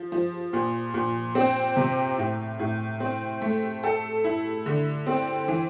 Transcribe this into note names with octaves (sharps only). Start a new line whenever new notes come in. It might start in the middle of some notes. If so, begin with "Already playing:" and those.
Already playing: F3
F3
A#2
A#2
C4
C3
A2
A2
C4
A3
A4
E4
D3
C4
E3